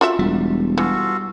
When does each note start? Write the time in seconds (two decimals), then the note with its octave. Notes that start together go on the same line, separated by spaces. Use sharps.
0.01 F4 F#4 E5
0.19 E1 G3
0.78 E3 F4 F#4 A4